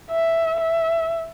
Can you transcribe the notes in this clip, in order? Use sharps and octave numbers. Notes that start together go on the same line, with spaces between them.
E5
E5